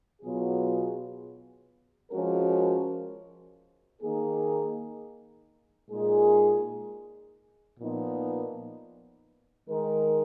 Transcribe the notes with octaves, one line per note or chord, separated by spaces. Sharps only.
B2 F#3 B3 F4 G#4
F3 G#3 C#4 F#4 A#4
D#3 A#3 D#4 G#4
A#2 G#3 D#4 G#4
A#2 F3 B3 D#4
D#3 G#3 D#4 A#4